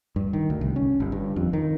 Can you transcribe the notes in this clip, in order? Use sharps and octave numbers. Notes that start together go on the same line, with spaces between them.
G2
D#3
D2
C2
C#4
G1
G2
F2
D#3